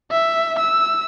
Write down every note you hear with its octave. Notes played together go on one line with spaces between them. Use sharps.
E5
E6